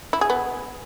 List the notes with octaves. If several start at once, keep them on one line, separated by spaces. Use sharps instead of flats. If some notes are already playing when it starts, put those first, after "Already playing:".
E4
G#4
B3